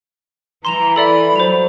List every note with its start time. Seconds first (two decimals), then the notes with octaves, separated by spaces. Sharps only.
0.65 E3 A#5 C6 E7 F7
0.96 A4 D5 E5 B5
1.36 F#3 C5 F7